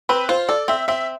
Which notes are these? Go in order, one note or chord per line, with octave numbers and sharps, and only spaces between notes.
C4 B4
F4 C5
A4 D5
C4 E5
C4 E5